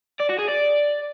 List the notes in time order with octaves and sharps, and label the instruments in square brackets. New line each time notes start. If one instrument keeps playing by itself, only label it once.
[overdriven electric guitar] D5
F#4
G#4
D5